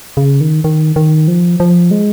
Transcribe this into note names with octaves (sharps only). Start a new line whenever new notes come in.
C#3
D#3
D#3
D#3
F3
F3
G#3